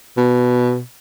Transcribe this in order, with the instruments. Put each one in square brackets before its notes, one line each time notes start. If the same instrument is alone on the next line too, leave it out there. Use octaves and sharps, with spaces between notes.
[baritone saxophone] B2